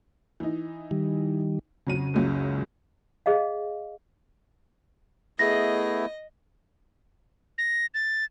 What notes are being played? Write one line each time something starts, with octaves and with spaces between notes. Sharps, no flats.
E3 D#4
D#3 G3
F2 C#3 F#3 D#7
F#1 C#2 F#3
G#4 D#5 F5
A3 B3 E4 G#4 D#5 A#6
A#6
A6